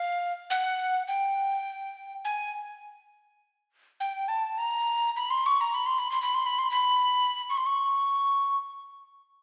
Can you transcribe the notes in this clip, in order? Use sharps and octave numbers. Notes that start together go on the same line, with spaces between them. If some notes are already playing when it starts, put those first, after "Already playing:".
Already playing: F5
F#5
G5
G#5
G5
A5
A#5
B5
C6
C#6
A#5
B5
C6
B5
C6
B5
C6
B5
C6
B5
C#6
C6
C#6